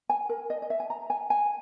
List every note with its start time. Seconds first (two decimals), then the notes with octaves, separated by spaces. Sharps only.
0.09 G#5
0.29 A#4
0.50 D#5
0.62 D#5
0.70 E5
0.80 G#5
0.90 A#5
1.10 G#5
1.30 G#5